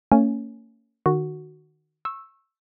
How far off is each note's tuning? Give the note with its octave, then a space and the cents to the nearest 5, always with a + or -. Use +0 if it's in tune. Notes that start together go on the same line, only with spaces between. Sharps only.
A#3 -40 C#4 +10 G#5 +0
D#3 -30 F#4 +0
C#6 -25 E6 +0